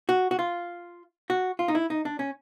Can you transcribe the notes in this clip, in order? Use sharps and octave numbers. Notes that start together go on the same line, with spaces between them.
F#4
F#4
F4
F#4
F4
D#4
E4
D#4
D4
C#4